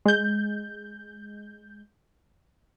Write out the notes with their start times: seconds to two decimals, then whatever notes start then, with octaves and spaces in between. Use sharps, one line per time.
0.05 G#3 G6